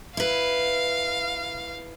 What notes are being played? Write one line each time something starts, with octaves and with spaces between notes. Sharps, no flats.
E4 B4 F5